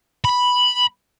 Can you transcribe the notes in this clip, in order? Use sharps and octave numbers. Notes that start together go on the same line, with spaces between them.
B5